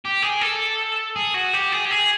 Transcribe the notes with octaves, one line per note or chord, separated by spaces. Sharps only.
G4
G#4
A4
G#4
F#4
G4
G#4
G4
G#4